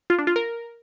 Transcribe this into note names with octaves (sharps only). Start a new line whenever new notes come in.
F4
D4
F4
A#4